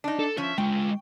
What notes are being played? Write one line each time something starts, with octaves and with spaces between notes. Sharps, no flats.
D4 D#4
A4
F3 C#4 E5
G#3 F4 G5